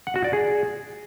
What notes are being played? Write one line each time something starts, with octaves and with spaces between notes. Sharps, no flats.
F#5
F#4
D5
G#4